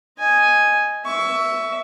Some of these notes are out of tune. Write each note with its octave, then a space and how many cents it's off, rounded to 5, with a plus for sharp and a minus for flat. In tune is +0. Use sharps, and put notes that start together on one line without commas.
D#5 +0 G#5 +0
E5 +0 C#6 +25